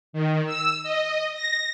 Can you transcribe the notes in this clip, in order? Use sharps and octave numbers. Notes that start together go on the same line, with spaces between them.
D#3
E6
D#5
A#6